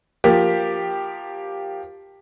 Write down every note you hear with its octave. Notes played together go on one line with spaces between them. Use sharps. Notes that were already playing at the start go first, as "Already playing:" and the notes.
F3 A#3 G4